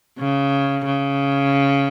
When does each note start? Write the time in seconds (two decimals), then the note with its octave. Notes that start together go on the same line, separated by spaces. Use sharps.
0.19 C#3
0.86 C#3